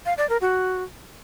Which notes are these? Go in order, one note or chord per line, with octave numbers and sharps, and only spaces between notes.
F5
D5
A#4
F#4